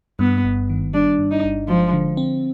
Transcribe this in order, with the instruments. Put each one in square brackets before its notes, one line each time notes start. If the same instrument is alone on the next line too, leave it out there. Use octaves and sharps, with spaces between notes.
[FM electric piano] G2 [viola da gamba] B3
[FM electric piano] G1
D#3
[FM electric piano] G3 [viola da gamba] D4
[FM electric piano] G2
[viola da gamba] D#4
[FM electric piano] G1
[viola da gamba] F3 [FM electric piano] G#3
[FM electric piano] D3
C4